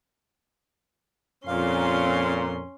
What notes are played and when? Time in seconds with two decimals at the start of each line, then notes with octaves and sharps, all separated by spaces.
1.47 F2 A#2 C#4 F5 C6